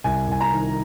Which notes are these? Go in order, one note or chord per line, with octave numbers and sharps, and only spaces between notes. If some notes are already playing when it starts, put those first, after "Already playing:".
C2 G#5
C2 G#5
A#5
D#3